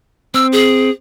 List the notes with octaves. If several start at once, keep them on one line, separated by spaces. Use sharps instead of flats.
C4 E6
G#4